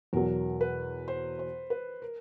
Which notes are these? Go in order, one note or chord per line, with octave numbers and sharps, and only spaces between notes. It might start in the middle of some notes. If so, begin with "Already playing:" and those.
E2 B2 F#3 A#4
B4
C5
C5
B4
A#4